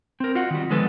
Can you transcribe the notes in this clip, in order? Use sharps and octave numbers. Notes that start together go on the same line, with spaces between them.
C4 A#4
F4 F#4 D#5 F#5
D#3 G3
D3 F3 G#3 B3 A4 B4